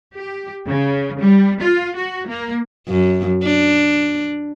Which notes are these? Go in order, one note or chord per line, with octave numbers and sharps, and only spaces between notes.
G4
C#3
G3
F4
F#4
A#3
F#2
D4